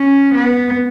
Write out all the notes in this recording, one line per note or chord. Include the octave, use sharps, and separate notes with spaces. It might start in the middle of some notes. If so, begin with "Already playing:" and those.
Already playing: C#4
B3